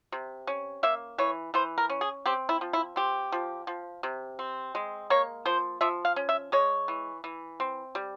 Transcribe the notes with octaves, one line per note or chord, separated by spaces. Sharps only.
C3
C#4
A#3 E5
E3 C#5
E3 C5
A#4
C#4
G#4
C4 G4
E4
F3
E4
C4 G4
F3
F3
C3
C4
G#3
A#3 C#5
F3 C5
F3 E5
F5
C#4
E5
G#3 C#5
E3
E3
C4
G3